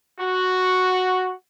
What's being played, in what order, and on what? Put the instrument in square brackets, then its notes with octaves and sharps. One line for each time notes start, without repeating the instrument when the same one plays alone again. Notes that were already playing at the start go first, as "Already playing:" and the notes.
[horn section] F#4